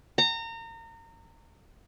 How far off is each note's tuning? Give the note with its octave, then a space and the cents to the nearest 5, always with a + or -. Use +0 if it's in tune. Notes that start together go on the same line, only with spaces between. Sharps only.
A#5 -30